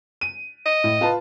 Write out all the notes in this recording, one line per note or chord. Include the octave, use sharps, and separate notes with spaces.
D#7
D#5
A2
F4 B4 A5